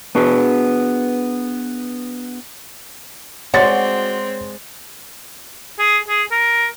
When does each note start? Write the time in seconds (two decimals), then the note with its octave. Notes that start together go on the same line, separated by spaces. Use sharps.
0.15 B3 D4 F#4 G#4 B4
3.54 G#3 C4 F#4 C#5 D5 C6 A6
5.79 G#4
6.08 G#4
6.31 A#4